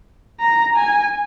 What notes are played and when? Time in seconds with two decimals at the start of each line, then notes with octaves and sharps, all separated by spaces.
0.40 A#5
0.76 G#5